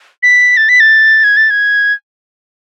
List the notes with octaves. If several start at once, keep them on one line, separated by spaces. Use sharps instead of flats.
B6
A6
B6
A6
G#6
A6
G#6